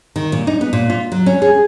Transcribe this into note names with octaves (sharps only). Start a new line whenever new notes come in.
D#3
A#2
D#4
B3
A#2
F4
F#3
C#4
G#4